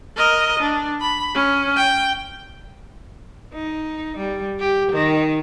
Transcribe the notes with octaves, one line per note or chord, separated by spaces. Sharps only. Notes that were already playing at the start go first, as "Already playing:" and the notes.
A#4 D#5
D4
B5
C#4
G5
D#4
G3
G4
D#3